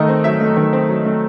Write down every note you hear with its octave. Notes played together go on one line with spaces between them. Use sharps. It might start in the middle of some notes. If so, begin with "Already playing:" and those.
Already playing: D#3 A3 D#5
C4
F#3 E5
A3
D#3
C4
F#3
A3